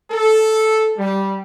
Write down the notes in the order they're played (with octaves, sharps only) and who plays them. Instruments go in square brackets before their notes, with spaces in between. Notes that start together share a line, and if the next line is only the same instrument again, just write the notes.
[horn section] A4
G3